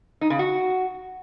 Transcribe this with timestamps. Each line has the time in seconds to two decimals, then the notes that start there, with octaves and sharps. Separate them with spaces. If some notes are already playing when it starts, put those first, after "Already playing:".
0.21 D#4
0.30 C#3
0.39 F#4